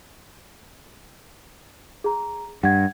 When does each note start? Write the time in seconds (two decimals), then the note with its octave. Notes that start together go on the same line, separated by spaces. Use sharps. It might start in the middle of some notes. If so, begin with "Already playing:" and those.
2.04 G#4 A#5
2.63 G2 F#5 G#6